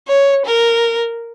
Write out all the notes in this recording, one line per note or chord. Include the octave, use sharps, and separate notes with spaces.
C#5
A#4